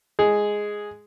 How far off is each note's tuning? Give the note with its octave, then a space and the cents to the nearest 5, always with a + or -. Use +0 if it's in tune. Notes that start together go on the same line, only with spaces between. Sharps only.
G#3 +0 G#4 +0